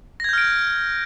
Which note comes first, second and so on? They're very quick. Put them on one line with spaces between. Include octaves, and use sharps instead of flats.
A#6 G#6 G6 F6 D7